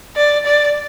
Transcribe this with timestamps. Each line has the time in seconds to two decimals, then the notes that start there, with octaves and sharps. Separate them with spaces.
0.16 D5
0.46 D5